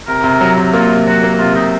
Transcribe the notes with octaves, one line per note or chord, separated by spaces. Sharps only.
C3 A#4
C3
F#3
C3
A#3 F4
C3
F#3 F#4
A#3
C3 F4
C3 D#4